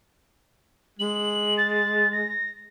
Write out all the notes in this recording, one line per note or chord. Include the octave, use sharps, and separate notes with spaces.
G#3 F#7
A6
A#6